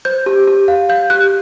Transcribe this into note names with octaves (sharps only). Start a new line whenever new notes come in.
C5 G6
G4
G4
F5
F5 G6
G4 F#6